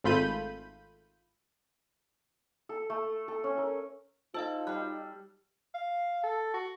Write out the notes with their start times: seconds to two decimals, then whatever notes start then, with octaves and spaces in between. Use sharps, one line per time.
0.04 G#1 A3 F4 B5 G6 D#7
2.69 A4
2.90 A3
3.28 A4
3.44 C#4
3.58 A#4
4.34 D#4 F4 A4 C5 D#5 F5
4.67 G3 G5 F#6
5.75 F5
6.24 A4
6.54 F#4